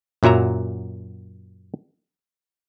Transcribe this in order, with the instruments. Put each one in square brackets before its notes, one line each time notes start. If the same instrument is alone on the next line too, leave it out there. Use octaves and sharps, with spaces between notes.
[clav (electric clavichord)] F#2 A#2 F#3 E5 A#5